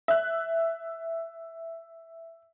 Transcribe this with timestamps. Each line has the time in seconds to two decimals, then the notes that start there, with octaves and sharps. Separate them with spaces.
0.08 E5 F#6